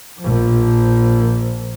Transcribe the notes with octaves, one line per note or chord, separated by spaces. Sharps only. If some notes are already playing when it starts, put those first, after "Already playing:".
A#1 F3